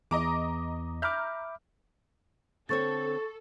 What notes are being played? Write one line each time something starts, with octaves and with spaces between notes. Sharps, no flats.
E2 D#5 A#5 D6
E5 A#5 B5 D6 F6 G6
D3 C4 A4 C#5 C#6 A6